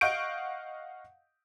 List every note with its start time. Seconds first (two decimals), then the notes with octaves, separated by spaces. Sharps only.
0.01 D#5 F5 F#5 C#6 G6 D7